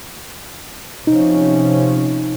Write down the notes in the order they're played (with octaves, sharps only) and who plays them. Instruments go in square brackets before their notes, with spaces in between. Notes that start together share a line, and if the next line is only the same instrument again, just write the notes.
[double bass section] C3 F3 C#4 [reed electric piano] D#4